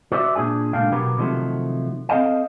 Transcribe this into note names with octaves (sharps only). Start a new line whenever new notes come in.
F#4 C5 D5 E5
A#2 D4 G#4 G#5
C#2 A#2 D4 A4 F5 G5
B2 F#3 B3 G4 A#4
C3 D#3 F3 F#3 A3
C4 A4 D#5 F5 G5